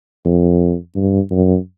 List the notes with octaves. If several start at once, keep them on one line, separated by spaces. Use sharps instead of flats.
F2
G2
F#2